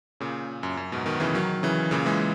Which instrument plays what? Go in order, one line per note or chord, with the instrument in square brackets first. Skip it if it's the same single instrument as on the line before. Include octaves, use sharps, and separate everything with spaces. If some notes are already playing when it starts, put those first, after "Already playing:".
[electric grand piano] A#2 C#3
F#2
F#2
G#2 B2
B2 D#3
C#3 E3
D#3 F#3
C#3 E3
A#2 C#3
E3 G#3